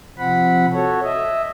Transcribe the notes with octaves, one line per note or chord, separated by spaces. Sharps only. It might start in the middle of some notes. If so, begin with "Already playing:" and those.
C3 F3 C4 F#5 B5
F#4 A4 C#5
D#5 E5